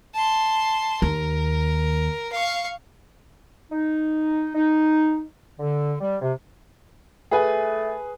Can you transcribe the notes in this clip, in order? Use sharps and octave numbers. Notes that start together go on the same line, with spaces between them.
A5 C6
D#2 A#4
F5 C#6
D#4
D#4
D3
G3
C3
A3 G#4 B4 G#5